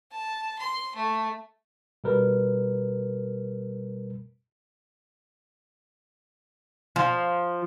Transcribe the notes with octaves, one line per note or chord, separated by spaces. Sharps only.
A5
C6
A3
B2 G3 A#4 B4
F3